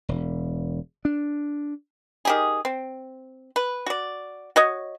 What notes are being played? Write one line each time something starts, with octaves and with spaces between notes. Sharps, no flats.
E1
D4
D#3 G4 G#4
C4
B4
F#4 D5
F#4 C#5 D#5